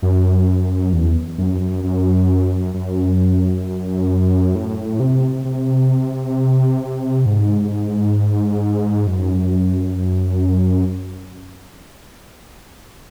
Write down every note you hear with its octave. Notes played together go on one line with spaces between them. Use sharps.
F#2
E2
F#2
F#2
F#2
F#2
A2
C3
C3
G#2
F#2